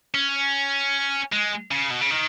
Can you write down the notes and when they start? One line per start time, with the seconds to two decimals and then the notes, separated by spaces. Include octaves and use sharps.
0.14 C#4
1.32 G#3
1.71 C#3
1.91 B2
2.01 C#3
2.11 D#3